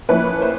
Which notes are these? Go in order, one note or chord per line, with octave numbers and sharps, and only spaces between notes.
F3 A#3 C#4 E4 B4
C5